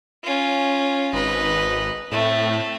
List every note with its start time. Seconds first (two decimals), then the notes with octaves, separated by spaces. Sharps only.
0.24 C#4 F4
1.13 G#1 D#4 B4
2.12 A2 A3 C4